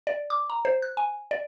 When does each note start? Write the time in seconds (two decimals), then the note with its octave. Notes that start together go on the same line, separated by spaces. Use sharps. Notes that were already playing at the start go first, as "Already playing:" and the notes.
0.07 D5
0.30 D6
0.50 A#5
0.65 C5
0.82 F#6
0.97 G#5
1.31 D5